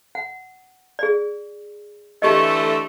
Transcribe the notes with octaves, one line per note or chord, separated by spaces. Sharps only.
F#5
G#4 D5
D3 E3 A3 G4 D#5